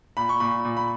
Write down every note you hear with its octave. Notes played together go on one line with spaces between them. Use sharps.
A#2 B5
C#6
A#2 B5
A#2
B5